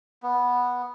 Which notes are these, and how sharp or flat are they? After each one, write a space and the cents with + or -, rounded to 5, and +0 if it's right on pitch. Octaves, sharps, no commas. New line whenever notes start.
B3 -5